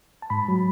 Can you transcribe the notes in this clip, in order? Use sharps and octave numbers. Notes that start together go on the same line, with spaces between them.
A5
G#2 B5
F#3